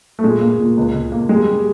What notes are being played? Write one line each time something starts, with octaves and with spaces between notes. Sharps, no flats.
A3
A#2 G#3
A#3
A#2
C#2
C#2
A#3
G3 G#3
G3